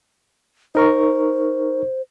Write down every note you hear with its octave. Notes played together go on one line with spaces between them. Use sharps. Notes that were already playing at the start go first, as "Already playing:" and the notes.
D#4 A#4 C5 C#6